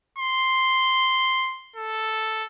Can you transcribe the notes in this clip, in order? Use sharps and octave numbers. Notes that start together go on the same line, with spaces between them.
C6
A4